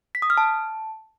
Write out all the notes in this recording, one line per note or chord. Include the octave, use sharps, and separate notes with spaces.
B6
D#6
F6
A5